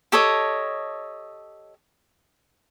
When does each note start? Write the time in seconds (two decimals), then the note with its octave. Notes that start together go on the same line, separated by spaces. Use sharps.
0.12 G4 A4 C#5 D#5